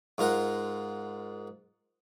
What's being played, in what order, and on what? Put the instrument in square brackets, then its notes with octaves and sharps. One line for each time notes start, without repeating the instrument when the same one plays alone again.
[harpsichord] G#2 F4 A#4 F#5